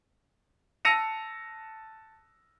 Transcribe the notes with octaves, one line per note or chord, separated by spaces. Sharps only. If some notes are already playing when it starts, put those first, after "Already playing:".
A5 E6 A#6 C#7 D#7 F7